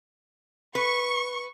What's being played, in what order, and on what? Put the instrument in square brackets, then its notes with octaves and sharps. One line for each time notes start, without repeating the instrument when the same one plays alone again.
[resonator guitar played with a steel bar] B4 [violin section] C#6